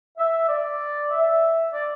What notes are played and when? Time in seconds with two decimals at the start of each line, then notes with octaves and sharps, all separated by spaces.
0.18 E5
0.49 D5
1.11 E5
1.73 D5